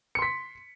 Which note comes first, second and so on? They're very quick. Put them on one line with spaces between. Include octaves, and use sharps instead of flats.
C#7 C6 B6